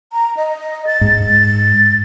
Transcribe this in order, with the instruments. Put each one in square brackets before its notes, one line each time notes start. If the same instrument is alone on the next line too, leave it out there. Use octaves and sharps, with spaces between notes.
[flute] A#5
D#5
A6
[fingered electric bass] G#2